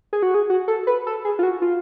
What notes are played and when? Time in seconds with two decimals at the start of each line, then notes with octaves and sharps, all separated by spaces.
0.13 G#4
0.23 F#4
0.34 G#4
0.50 F#4
0.68 A4
0.87 B4
1.07 A4
1.25 G#4
1.39 F4
1.43 F#4
1.62 F4